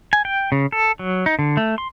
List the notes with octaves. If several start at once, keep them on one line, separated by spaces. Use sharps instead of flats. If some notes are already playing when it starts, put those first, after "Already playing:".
G#5
G5
C#3
A4
F#3
D#4
D3
A3
C6